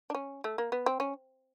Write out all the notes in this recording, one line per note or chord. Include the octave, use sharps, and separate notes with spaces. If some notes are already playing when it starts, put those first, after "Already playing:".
D4
C#4
A3
A#3
B3
C4
C#4